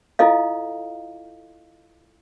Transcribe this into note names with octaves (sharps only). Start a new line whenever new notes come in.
E4 F4 A4 D#5 F5